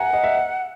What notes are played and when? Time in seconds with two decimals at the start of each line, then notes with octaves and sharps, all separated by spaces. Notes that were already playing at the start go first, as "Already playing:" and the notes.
Already playing: E5 F#5 G#5 A#5
0.13 D#5
0.24 E5